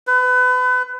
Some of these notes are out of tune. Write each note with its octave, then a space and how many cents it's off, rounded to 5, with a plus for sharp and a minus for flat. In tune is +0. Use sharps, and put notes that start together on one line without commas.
B4 +30